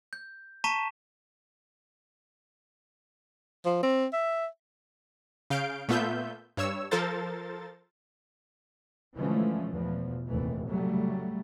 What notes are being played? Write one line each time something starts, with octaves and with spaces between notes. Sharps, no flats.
G6
A5 A#5 C#6 B6 D#7 E7
F3
C4
E5
C#3 F5 G6 D7
A#2 A3 B3 F4 E5 G6
G2 C#5 E6
F3 A4 A#4 C5 A6
D3 E3 F3 G#3 A3 C#4
E2 B2 F3
F1 A#1 D#2 E3 A3
C#3 F#3 G3 A3